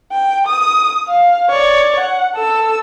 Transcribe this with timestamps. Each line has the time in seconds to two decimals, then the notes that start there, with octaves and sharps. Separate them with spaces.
0.12 G5
0.47 D#6
1.08 F5
1.50 C#5 D5
2.00 F#5
2.35 A4 E6